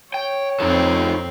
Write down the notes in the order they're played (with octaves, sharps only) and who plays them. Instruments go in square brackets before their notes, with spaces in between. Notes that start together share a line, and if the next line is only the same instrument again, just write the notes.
[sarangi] C#5 [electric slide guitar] G5
[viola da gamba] F2 C4 [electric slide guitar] D#4 F4 A4